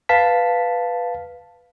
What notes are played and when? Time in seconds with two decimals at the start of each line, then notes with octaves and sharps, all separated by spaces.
0.09 B4 F5 A5 B6